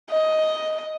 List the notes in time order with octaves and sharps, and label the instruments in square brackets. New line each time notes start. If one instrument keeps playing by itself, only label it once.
[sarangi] D#5